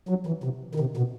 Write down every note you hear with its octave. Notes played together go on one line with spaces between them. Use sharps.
F#3
E3
C3
D#3
C3
B2